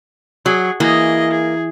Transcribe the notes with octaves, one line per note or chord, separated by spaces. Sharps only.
F#3 G#4
E3 A#3 G#4 D#5
G#4